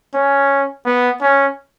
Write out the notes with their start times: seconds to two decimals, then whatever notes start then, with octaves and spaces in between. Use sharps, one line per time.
0.14 C#4
0.85 B3
1.21 C#4